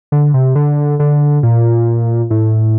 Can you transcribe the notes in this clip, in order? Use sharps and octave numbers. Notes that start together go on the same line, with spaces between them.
D3
C3
D3
D3
A#2
A2